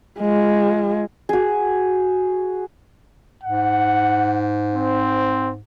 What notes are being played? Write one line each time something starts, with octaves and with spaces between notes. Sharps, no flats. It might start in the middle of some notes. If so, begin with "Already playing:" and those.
G#3 F4
F#4 G#4
G#2 F#5
C4